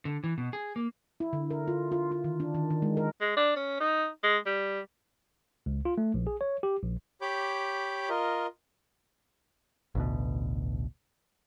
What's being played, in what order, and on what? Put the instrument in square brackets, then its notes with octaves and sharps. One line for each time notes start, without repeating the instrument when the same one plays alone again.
[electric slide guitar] D3
E3
B2
G#4
A#3
[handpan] E4
D3
A#4
F4
F4
F4
D#3
D4
D#3
D#3
G#3
A#4
[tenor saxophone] G#3
D4
C#4
D#4
G#3
G3
[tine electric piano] C#2
F4
A3
A#1
G#4
C#5
G4
A#1
[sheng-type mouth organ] G4 C#5 B5 D6 G6
F4 A#4 D#5
[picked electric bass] A1 D2 B2